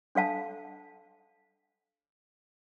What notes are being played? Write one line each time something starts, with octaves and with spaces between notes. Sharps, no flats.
D4 A4 F5 A5